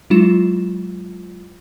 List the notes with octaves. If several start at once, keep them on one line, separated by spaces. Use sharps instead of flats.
F#3 G#3 E4 F4 E7